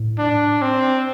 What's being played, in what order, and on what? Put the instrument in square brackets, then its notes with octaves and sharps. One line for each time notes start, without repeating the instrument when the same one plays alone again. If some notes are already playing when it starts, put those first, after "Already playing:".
Already playing: [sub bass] A2
[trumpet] D4
C4